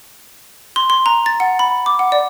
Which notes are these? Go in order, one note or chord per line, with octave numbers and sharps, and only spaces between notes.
C6
C6
A#5
A6
F#5
B5
D6
F#5
D5